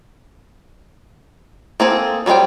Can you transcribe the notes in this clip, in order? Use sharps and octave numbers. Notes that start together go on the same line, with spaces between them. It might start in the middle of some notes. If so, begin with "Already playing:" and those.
A#3 C4 G#4 A4
F#3 G3 G#4 C5 G5